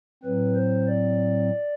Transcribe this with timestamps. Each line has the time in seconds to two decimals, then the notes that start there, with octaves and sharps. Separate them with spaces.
0.23 A2 F#3 C4 B4
0.55 C5
0.88 D5